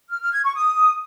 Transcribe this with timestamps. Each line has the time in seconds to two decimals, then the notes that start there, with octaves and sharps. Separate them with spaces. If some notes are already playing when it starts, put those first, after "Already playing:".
0.10 F6
0.21 F6
0.32 G#6
0.43 C#6
0.55 D#6